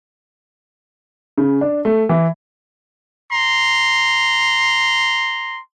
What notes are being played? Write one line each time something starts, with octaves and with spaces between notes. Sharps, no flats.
C#3
D4
A3
E3
A#5 C6